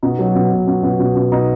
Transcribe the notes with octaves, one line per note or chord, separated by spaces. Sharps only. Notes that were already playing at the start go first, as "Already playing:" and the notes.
B2 D#4
F#3
B2
B2
B2
B2
B2
B2
B2 D#4